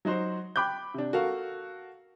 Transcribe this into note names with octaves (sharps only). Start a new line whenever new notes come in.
F#3 D#4 F#4 C5
G5 B5 D6 F#6 G6
C3 D4
F#4 A4 A#4 F5 C#6